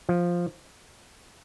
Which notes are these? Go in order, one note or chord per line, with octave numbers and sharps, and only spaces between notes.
F3